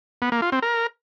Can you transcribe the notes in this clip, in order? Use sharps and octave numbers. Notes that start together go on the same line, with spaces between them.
B3
A#3
F4
C4
A#4